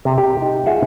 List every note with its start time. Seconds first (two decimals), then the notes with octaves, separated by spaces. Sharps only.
0.05 C3
0.18 G4
0.42 D#4
0.66 F4 G#4 E5 F#5